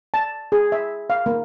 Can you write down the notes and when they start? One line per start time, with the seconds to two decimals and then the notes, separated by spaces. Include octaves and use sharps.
0.14 A5
0.52 G#4
0.72 E5
1.10 F5
1.26 A#3